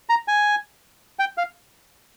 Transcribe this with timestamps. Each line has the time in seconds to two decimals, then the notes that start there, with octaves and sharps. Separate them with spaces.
0.09 A#5
0.28 G#5
1.19 G5
1.38 F5